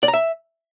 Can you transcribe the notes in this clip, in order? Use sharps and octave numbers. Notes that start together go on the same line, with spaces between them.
D5
A#5
E5